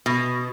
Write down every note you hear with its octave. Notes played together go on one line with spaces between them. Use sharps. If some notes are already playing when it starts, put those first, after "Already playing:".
B2